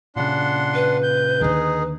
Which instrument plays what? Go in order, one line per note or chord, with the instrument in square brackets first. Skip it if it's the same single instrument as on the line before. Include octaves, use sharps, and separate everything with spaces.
[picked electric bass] A#2 C#3 [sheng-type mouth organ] D4 F#5 C6
[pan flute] B4
[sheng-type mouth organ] G6
[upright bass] D#2 D3 [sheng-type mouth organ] D#4 G#4